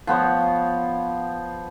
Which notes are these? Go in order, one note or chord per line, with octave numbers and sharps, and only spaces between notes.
F3 B3 C5 C#5